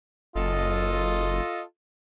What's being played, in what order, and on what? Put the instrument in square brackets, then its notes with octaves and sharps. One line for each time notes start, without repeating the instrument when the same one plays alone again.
[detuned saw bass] F#1 [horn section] F4 A4 D#5